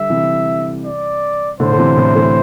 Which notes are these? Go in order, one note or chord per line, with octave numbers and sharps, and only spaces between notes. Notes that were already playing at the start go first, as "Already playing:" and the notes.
Already playing: D3 G3 E5
C3 E3
D5
A2 D3 C5
D3
C3 E3
A2 D3
E3 A3